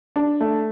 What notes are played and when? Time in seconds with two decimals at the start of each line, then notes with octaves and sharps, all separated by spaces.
0.16 D4
0.41 A3